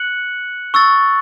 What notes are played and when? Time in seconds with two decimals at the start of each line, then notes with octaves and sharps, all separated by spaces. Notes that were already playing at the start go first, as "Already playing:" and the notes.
Already playing: F#6 C#7 F#7
0.74 C#6 E6 A6